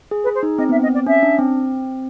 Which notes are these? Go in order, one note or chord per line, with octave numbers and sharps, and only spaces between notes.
G#4
B4
G#4
C5
D#4
C4 D#5
B3 E5
C4 D#5
D5
C#4 E5
D4
C4